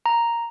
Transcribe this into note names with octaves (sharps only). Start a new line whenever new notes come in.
A#5